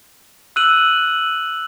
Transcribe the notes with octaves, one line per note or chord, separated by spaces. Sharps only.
E6 F#6 D#7 F#7